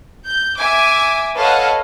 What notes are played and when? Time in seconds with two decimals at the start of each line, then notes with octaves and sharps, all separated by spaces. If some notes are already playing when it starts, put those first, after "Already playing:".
0.24 G6
0.58 E5 G#5 D6
1.36 A4 B4 C#5 D#5 F5 F#5